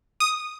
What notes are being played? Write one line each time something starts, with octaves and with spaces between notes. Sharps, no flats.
D#6